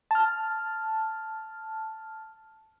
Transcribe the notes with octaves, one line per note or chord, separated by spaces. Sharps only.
A5 F6